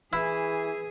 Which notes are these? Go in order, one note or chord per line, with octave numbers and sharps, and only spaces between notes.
E3 E4 G#4